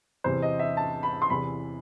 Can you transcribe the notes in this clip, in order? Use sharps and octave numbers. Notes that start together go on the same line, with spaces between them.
E2 C3 E3 C5
D#5
E5
A5
B5
C6
E2 C3 E3 B5